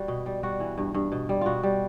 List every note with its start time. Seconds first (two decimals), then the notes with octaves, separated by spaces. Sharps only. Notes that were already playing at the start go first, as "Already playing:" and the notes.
Already playing: G3 F#4
0.08 B2
0.26 G3
0.43 G3 F#4
0.60 E3
0.78 G2
0.94 G2
1.12 B2
1.29 G3
1.41 B2 F4 F#4
1.63 G3